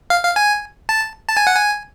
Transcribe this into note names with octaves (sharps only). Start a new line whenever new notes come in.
F5
F5
G#5
A5
A5
G#5
F#5
G#5